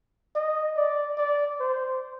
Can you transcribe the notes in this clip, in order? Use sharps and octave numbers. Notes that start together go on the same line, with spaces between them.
D#5
D5
D5
C5